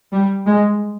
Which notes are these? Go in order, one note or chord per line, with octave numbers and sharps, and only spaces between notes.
G3
G#3